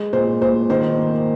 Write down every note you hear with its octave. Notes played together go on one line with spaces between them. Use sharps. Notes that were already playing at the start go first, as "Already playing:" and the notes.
Already playing: G#3
A#2 C5
A#2 C5
D#3 C5
A#3